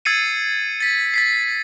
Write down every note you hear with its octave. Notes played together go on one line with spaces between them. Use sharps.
E6 G#6 A6 C7 C#7 D#7
A6 B6
A6 B6 C7